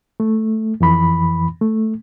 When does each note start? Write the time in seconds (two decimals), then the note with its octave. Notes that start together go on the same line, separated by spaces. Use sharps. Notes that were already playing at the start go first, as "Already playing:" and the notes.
0.20 A3
0.81 F2 E3 B5
1.61 A3